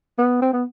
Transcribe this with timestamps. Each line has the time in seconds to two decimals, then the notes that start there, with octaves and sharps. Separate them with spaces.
0.18 B3
0.42 C4
0.53 B3